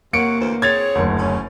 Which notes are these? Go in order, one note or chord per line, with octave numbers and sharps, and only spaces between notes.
C3 A#3 C#5 F#5 C#7 D7
D2 E3 C5
C4 G#4 C#5 G#6 A6 F7
F#1 D2
C#4